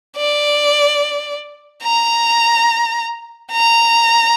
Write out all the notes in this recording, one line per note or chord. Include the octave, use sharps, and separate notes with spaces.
D5
A#5
A#5